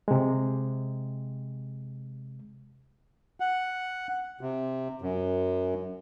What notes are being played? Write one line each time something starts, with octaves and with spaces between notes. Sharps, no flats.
C3 G#3
F#5
C3
F#2